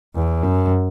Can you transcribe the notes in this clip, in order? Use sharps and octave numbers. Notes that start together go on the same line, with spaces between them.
E2
F#2